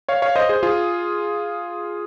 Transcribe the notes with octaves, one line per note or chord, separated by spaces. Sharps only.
C#5 F5
C#5 F5
C5 D#5
G#4 C5
F4 G#4